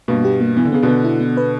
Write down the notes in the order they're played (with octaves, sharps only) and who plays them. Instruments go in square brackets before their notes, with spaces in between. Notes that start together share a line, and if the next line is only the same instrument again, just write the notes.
[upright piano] G2 B2 [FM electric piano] A#3
[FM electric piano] G4
A#3
[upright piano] E3 [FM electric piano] B3
[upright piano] D3
[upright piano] C#3 [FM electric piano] B3
[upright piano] B2 D3
[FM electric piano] B3
E4
B3
B4